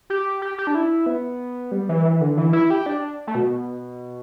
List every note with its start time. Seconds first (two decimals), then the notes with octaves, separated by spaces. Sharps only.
0.10 G4
0.42 G4
0.58 G4
0.67 D4
0.75 E4
1.06 B3
1.72 G3
1.89 E3
2.05 E3
2.21 D3
2.37 E3
2.53 E4
2.70 G4
2.86 D4
3.27 A3
3.35 B2